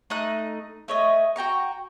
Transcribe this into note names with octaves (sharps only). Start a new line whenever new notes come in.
A3 D#4 F#6
A3 C#5 D#5
F#4 G5 A#5 C#6